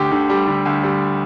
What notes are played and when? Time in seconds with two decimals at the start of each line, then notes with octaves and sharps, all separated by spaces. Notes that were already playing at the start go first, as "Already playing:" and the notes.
Already playing: D2 D3 G4
0.11 D3
0.30 G3
0.47 D3
0.65 D2
0.83 G3